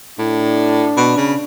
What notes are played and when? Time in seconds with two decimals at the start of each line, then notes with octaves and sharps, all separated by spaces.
0.19 A2 D4
0.97 B2
1.17 C#3